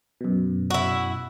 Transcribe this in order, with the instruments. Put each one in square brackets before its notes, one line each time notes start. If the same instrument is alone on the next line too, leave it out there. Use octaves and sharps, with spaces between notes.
[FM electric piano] F#2 B2
[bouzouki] E4 F#4